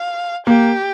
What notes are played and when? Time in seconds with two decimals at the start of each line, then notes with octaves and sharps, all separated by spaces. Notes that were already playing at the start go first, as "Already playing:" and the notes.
Already playing: F5
0.47 A#3 G4